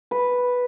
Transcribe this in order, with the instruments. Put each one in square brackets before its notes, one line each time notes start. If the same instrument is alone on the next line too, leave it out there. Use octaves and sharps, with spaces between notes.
[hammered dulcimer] B4